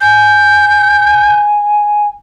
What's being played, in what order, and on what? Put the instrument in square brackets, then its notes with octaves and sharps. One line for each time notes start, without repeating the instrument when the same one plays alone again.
[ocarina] G#5 [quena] G6